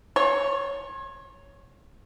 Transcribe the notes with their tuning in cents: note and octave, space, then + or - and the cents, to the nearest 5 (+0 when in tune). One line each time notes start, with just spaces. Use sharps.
C#5 +5 C6 +45